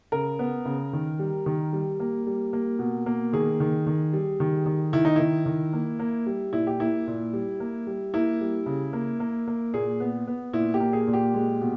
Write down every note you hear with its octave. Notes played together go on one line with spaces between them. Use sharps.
C#3 A#4
B3
C#3
D#3
G3
D#3
G3
A#3
G3
A#3
B2
A#3
D#3 G#4
D#3
D#3
G3
D#3
D#3
D#3 E4
D#4
D#3 E4
D#3
A#3
A#3
G3
A#2 E4
G4
A#3 E4
A#2
G3
A#3
G3
A#3 E4
G3
C#3
A#3
A#3
A#3
A#2 G#4
B3
B3
A#2 E4
G4
A#3
G#4
A#2
G4
G#3
B2